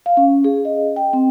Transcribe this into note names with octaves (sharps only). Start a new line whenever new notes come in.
F5
C#4
G#4
D#5
G5
C4